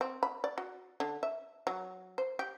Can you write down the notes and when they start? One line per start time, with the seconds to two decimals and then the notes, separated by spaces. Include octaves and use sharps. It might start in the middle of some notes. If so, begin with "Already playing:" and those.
0.01 C4
0.23 B5
0.44 D5
0.58 F#4
1.00 D3
1.23 E5
1.67 F#3
2.18 C5
2.39 G4